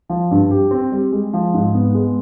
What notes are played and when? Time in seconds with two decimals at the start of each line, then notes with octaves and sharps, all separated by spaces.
0.10 F3
0.31 G2
0.51 G4
0.71 C4
0.92 G3
1.12 G#3
1.33 F3
1.54 G#2
1.74 B3
1.94 G#3